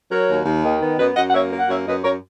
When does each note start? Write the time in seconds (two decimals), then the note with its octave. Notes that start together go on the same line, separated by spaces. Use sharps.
0.10 F#3 A#4 C#5
0.28 D#2
0.45 D#2
0.63 D#3
0.80 B3
0.98 F#2 B4 D#5
1.15 F#2 D#5 F#5
1.28 F#5
1.33 A#3 C#5 E5
1.51 A#3
1.58 F#5
1.68 F#2 C#5 E5
1.86 F#2 B4 D#5
2.04 F#2 A#4 C#5